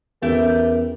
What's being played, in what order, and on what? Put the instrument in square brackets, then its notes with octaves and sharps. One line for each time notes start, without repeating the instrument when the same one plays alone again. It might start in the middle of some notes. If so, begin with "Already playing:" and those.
[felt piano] E2 C#4 [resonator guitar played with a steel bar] A3 G4 E5 [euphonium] A#4